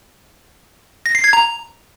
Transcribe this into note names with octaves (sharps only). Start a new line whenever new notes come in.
A#6
C7
G#6
A#5